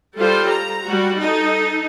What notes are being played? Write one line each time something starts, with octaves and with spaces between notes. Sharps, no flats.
G3 F4 G4 A4 C5
A#5
G3 F#4
D#4 A4